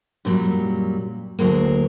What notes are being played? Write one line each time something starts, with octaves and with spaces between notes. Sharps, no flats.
F#2 A#2 F#3 G3
D2 F#3 G#3 A#3